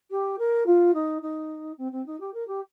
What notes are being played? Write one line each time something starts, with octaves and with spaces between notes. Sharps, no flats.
G4
A#4
F4
D#4
D#4
C4
C4
D#4
G4
A#4
G4